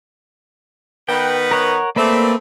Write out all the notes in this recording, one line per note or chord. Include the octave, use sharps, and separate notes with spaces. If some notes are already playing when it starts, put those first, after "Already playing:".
D#3 B3 B4 G5
A#4 C#5 F#5
A3 A#3 C4 B4 D5 E5